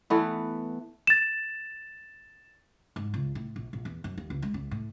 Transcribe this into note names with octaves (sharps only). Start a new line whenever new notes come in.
E3 A3 B3
A6 E7
G#2
C#2
A2
A#1
A#1
E2
F#2
D#2
C#2
G#3
C#2
A2